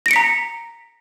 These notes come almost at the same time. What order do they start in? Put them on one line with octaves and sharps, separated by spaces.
A#6 D7 C#7 B6 A#5